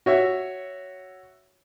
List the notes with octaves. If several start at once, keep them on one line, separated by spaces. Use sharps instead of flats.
F#4 C#5 E5